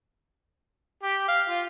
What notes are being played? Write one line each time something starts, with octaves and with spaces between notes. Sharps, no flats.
G4
F5
F4